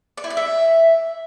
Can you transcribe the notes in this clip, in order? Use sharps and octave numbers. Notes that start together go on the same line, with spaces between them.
D5
E4
D5
E5